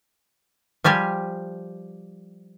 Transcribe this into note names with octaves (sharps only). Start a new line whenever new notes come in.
F3 G3 G4 G#5